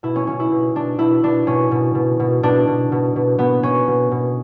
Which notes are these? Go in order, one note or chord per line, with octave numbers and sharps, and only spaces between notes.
B2 E4
C#4
B2 C#4
E4
B2
B2 D4
B2 E4
B2 D4
B2 C#4
B2
B2
B2
B2 D4
B2
B2
B2
B2 B3
B2 C#4
B2
B2